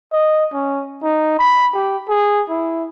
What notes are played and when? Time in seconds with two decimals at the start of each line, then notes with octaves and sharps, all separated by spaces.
0.12 D#5
0.53 C#4
1.03 D#4
1.39 B5
1.74 G4
2.08 G#4
2.49 E4